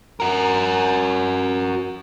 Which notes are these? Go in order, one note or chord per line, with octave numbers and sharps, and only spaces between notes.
F#4 A#4